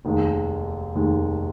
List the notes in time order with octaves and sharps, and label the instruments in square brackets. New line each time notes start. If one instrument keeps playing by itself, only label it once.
[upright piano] F1 D#2 D#3 G#3
F1 D#2 D#3 G#3